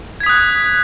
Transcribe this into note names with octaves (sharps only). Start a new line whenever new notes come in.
D#6 F#6 G#6 B6